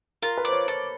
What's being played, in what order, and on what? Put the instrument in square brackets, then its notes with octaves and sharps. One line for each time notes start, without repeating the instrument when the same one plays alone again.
[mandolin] F4 [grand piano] A#4
[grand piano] B4
[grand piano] C5 [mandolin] D5
[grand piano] C#5
[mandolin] A4 [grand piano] C#5